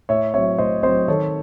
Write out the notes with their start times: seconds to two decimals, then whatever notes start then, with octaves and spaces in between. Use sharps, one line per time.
0.09 A2 C#5 E5
0.34 F#3 C4 C#5 E5
0.58 A2 C5 D#5
0.83 F#3 C4 C5 D#5
1.08 D#3 A4 C#5